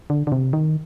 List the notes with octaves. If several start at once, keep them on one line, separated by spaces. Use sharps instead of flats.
D3
D3
C3
D#3